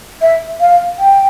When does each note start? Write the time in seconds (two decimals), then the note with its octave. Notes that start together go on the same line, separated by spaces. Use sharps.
0.22 E5
0.60 F5
0.99 G5